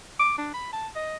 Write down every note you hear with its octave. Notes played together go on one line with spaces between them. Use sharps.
D6
D4
B5
A5
D#5